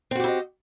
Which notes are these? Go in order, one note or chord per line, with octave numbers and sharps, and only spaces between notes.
C4 E4 F#4 G4 D#5